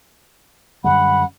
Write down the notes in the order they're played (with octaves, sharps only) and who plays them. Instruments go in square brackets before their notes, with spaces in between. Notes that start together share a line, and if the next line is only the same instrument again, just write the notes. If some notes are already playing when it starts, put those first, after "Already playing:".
[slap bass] F#2 D3 G3 [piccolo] F#5 [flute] B5